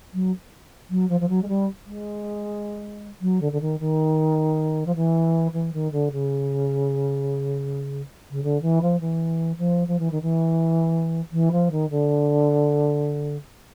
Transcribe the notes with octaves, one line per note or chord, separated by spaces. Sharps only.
F#3
F#3
F3
F3
F#3
G#3
G3
G#3
F#3
D3
D3
D#3
D#3
F3
E3
E3
D#3
D3
C#3
C#3
D3
E3
F3
E3
F3
F3
E3
D#3
E3
E3
F3
D#3
D3